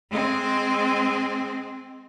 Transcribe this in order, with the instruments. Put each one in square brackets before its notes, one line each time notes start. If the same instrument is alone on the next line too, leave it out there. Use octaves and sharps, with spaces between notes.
[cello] G#3 C4